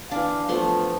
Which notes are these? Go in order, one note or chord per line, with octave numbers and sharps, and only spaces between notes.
E3 D4 F5
F3 A3 B3 C6